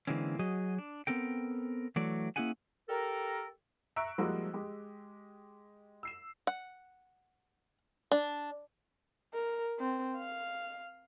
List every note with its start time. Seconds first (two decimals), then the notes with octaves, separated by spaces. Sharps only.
0.07 D3 E3 G#3 A#3 C4 C#4
0.39 F#3 F#4 G#4 D#5
0.78 D4
1.07 B3 C4 A4 A#4 G5
1.96 E3 F#3 A3 D5
2.36 A#3 C#4 E4 G#4 F#5 G#5
2.89 G4 A4 A#4
3.96 E5 A#5 C#6 E6 F#6 D7
4.18 F3 G3 G#3 A#3 E4 F#4
4.53 G#3 G4
6.03 E6 C7 E7
6.47 F#5
8.12 D4
9.34 A#4
9.80 C4
10.17 F5